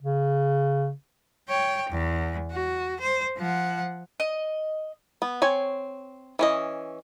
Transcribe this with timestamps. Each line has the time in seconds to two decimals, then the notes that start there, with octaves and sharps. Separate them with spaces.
0.02 C#3
1.49 C#5 G5
1.90 E2
2.52 F#4
3.01 C5
3.37 F3 F#5
4.20 D#5
5.22 B3
5.42 C4 C#5 G#5
6.39 E3 C#4 D#5